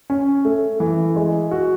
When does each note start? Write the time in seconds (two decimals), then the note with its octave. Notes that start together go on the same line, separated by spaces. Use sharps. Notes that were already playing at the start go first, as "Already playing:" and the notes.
0.10 C#4
0.45 A3
0.80 E3
1.16 G#3
1.51 F#4